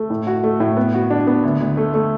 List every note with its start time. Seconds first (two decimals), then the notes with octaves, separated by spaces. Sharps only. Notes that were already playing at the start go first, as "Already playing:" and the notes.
Already playing: A3
0.10 A2
0.27 F#4
0.44 A3
0.60 A2
0.77 B3
0.94 F#4
1.10 D4
1.27 B3
1.43 D2
1.60 D2
1.77 A3
1.94 A3